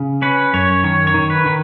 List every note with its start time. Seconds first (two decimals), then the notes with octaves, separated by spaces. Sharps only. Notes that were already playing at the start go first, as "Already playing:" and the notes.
Already playing: C#3
0.22 C#4 B4
0.53 F#2 C#5
0.84 D#3 C#5
1.07 C#5
1.14 D#3
1.30 B4
1.46 D#3